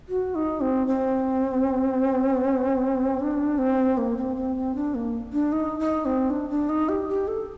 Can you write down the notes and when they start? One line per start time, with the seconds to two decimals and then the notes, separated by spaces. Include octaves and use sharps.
0.09 F#4
0.35 D#4
0.61 C4
0.87 C4
3.20 D4
3.58 C4
3.97 A#3
4.17 C4
4.36 C4
4.56 C4
4.75 D4
4.95 A#3
5.33 D4
5.52 D#4
5.79 D#4
6.05 C4
6.30 D4
6.50 D4
6.69 D#4
6.89 G4
7.09 G4
7.28 A4